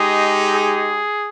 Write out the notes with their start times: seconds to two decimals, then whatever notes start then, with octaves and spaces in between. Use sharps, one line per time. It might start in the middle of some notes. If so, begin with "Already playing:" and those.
Already playing: G#3 D#4 G4 G#4
0.50 G#4